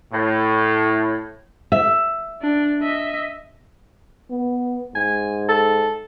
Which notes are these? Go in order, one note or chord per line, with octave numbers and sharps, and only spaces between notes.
A2
E5
D4
D#5 E5
B3
G#2 G#5
A4